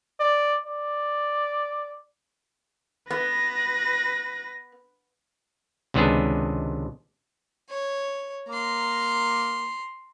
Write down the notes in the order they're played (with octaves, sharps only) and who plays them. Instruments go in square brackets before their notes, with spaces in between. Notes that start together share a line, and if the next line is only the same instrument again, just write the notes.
[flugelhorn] D5
D5
[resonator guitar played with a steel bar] B3 [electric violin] B4 A#6
[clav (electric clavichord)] C#2 C3 D#3 B3 D4 G#4
[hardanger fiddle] C#5
[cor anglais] A#3 [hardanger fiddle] A#5 C6